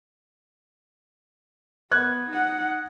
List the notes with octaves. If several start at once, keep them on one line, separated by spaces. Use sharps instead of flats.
B3 F#6 G#6
D#4 F#5